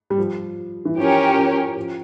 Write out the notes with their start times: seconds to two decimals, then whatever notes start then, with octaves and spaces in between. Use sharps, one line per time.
0.10 G3
0.18 F3
0.85 E3
0.98 F3 C#4 G4 A#4 C#5
1.37 F3
1.77 F3